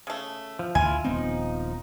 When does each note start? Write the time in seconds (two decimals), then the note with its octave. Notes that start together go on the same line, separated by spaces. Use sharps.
0.07 C#3 A3
0.59 F3
0.75 D2 E4 F4 G#5
1.04 D#1 F3 B3 C4 D#4